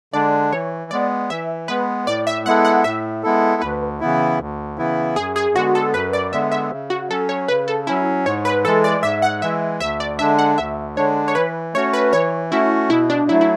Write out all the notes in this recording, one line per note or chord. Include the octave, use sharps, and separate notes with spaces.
D3 G#3 D4 D5
E3 C#5
G#3 B3 D5
E3 E5
G#3 B3 B4
A2 D5
E5
G#3 B3 E4 A4 F#5
F#5
A2 E5
G#3 B3 E4 A4
D2 B4
C#3 E3 B3 E4
D2
C#3 E3 B3 E4
F#2 G#4
G#4
D3 G#3 B3 F#4
A4
F#2 B4
D5
D3 G#3 B3 E5
E5
C#3
F#4
F#3 C#4 A4
C#5
C#3 B4
A4
F#3 C#4 E4
G#2 C#5
B4
E3 G#3 A4
D5
G#2 E5
F#5
E3 G#3 E5
D2 E5
D5
D3 G#3 D4 E5
F#5
D2 E5
D3 G#3 D4 C#5
C#5
E3 B4
A3 C#4 F#4 C#5
B4
E3 C#5
A3 C#4 E4 F#4
B2 E4
D4
F#3 A3 E4
E4